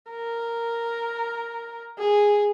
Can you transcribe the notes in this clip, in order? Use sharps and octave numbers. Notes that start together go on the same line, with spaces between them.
A#4
G#4